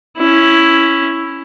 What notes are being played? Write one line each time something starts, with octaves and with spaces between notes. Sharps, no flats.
C#4 E4